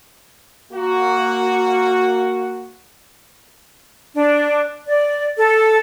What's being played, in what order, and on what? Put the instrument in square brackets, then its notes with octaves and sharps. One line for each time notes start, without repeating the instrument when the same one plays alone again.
[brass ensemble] A#3 F#4
[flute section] D4
D5
A4